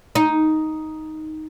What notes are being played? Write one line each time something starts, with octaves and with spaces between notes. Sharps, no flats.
D#4